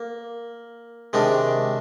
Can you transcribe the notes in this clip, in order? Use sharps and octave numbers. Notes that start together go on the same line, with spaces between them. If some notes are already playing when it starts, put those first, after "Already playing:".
Already playing: A#3
C3 D#3 G#3 D4